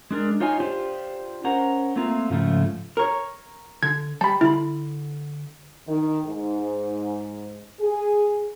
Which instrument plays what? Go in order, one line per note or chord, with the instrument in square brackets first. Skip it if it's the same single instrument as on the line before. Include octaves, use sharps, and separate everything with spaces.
[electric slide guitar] G#3 D4 A#4 D5
D#4 F4 C#5 D#5 G#5
D4 F4 G4 C5
C#4 A#4 C5 F#5 A#5
A3 A#3 C4 F4 A#5
G#2 C#3 F3 A3
[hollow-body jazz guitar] A#4 C#5
[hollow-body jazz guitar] D3 [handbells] G#6
[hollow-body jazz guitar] G3 [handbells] A5 B5
[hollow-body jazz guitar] D3 B5 [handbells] E4
[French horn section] D#3
G#2
G#4